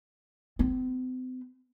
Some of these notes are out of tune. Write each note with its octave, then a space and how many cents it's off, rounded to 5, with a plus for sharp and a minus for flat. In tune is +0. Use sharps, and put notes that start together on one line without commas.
C4 -45